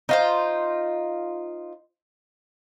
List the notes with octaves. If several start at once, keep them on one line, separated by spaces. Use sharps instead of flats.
D#4 F4 C5